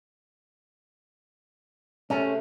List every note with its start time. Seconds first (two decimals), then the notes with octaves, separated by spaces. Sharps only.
2.10 C3 G#3 A3 C#4